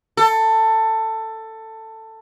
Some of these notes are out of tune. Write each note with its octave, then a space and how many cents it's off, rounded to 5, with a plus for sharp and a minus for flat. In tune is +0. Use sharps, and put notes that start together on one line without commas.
A4 +15